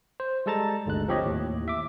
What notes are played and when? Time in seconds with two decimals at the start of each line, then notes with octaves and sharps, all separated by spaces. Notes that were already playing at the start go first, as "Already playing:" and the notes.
0.20 C5
0.46 G3 G#3 A4 A5 A#5 A6
0.86 G1 D2 D3 G#3 F#6
1.08 F3 C4 G4 C#5 D#5
1.25 D#2 A2
1.68 E5 D6